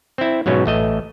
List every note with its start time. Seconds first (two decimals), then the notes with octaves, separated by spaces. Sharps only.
0.18 C4 E4
0.46 G#2 B2 F#3 C#4
0.66 A1 A3 D#5